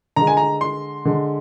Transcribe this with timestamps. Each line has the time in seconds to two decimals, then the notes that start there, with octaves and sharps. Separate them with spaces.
0.16 D3 G#3 A#5
0.27 G#5
0.37 A#5
0.61 C6
1.05 D3 G#3